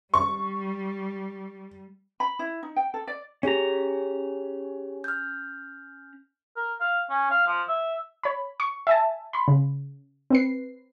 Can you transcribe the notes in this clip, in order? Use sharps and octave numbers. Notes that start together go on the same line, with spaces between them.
G3 C#6
B5
E4
D#4
G5
A4
D5
C#4 G4 G#4 C#5 A#5
F6 G6
A#4
F5
C#4
F5
F3
E5
C#5 B5
C#6
E5 G#5 A5
B5 C6
C#3
C4 B4 C7